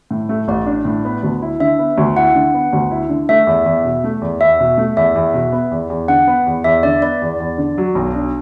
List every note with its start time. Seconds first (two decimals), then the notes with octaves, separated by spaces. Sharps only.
0.11 A2
0.29 A3
0.48 A1 D5
0.66 D4
0.85 A2
1.05 B3
1.23 D2
1.42 E4
1.60 D3 E5
1.79 B3
1.98 D2
2.17 E4 F#5
2.35 D3
2.54 B3
2.73 D2
2.91 E4
3.09 D3
3.29 A3 E5
3.47 E2
3.66 E2
3.85 B2
4.04 A3
4.21 E2
4.41 E2 E5
4.60 B2
4.78 A3
4.97 E2 E5
5.15 E2
5.34 B2
5.52 B3
5.71 E2
5.90 E2
6.08 D3 F#5
6.28 B3
6.46 E2
6.64 E2 E5
6.83 D3 D5
7.02 B3 D5
7.22 E2
7.40 E2
7.58 D3
7.78 F#3
7.95 B1
8.15 D4